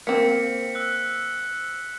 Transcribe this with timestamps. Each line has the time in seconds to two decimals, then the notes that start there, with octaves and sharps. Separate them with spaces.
0.07 A#3 C4 B6 C#7
0.75 E6 F#6